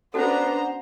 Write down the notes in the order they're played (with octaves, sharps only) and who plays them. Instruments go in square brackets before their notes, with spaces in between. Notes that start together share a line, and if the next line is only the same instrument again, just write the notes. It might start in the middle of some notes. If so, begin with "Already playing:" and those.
[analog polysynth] B3 D4 [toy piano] C#4 F#4 A4 [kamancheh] C5 A#5 [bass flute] F#5